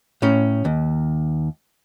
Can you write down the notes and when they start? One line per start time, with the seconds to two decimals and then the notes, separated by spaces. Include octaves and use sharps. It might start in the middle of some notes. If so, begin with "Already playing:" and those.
0.22 A2 C#4
0.65 D#2